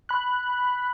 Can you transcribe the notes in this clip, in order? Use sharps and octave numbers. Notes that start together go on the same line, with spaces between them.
B5 F#6